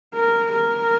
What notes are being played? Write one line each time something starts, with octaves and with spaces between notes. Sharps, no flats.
A#4
A#4